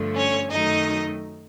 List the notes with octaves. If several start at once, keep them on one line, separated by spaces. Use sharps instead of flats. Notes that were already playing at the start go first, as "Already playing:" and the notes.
Already playing: G2 D3 F3 A3
C#4 C#5
F#2 D#3 F#3 A3 D#4 D#5